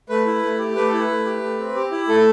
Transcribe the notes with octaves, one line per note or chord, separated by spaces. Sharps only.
A3 B4
E4
A3
G4
A3 B4
E4 A4
B4
A3
G4
A3
C4
G4
E4
A3 A4